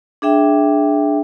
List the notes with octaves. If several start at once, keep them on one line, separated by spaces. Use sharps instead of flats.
D4 G#4 E5 G5